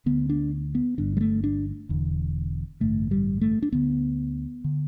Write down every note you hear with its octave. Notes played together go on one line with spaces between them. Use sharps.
D2 D3 B3
D4
B3
G1 G2 D3 D4
G3
A3
D4
E1 E2 D3
A1 G2 D3 A3
G3
A3
D4
D2 D3 B3
D3